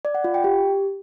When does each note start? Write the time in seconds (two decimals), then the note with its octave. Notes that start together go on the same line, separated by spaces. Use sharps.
0.05 D5
0.14 F#5
0.24 F4
0.34 G5
0.44 G4